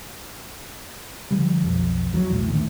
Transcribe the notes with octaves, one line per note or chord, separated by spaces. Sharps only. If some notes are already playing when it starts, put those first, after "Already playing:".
D3 F3 G3
B1 F2
E2 F#3
B1 E2 A2
D#2 A2 D3